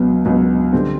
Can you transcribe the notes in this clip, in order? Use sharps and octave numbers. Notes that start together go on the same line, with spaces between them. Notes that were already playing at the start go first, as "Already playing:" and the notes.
Already playing: C#2 B2 F#3 B3
C#2 B2 F#3 B3
D3 G3 C4